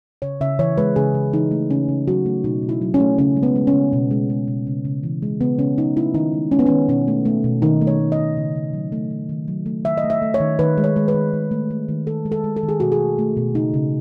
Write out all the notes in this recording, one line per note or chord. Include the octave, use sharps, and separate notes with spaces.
C#3 C#5
C#3 E5
E3 C#5
G#3 B4
C#3 G#4
C#3
E3 D#4
A3
C#3 C#4
C#3
F#3 F#4
A3
B2 D#4
B2
E4
F#3
C#4
A3
C#3 C#4
G#3
B3
G#3
C#4
C#3
B2
G#3
G#3
B2
C#3
C#3
E3
G#3
C#3 B3
C#3 C#4
F#3 D#4
A3 E4
D#3 D#4
G#3
G#3 C#4
B3
D#3 C#4
B2 C#4
A3
A3
B2
D#3 D#4
A3
C#5
A3
D#5
D#3
C#3
C#3
F#3
A3
D#3
D#3
F#3
A3
D#3 E5
D#5
A3
E5
A3
C#5
D#3
D#3 B4
G#3
C#5
G#3
B4
D#3
D#3
A3
A3
D#3
D#3 A4
G#3
A4
G#3
A4
D#3
G#4
B2 F#4
G#4
A3
A3
B2
C#3 D#4
C#3